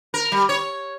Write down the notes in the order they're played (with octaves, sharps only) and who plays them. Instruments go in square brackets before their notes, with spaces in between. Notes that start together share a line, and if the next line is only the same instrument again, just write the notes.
[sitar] A#4
G3
C#5